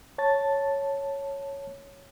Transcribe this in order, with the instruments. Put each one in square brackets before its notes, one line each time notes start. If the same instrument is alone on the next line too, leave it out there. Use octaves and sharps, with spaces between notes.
[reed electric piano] C#5 A5 A6